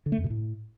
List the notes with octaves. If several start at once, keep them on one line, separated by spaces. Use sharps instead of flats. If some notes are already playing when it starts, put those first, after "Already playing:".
D3
A3
F2
B2
A2